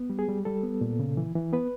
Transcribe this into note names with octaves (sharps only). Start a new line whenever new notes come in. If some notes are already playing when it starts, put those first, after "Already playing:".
Already playing: B3
G3
G#4
G3
G3 A4
B3
A#2
C#3
E3
E3
B3 B4